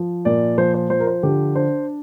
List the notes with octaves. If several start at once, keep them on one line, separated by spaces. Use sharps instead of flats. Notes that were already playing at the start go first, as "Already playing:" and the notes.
Already playing: F3
A#2 D5
F3 C5
C5
F3 C5
A#4
C5
D3 G4
D4 C5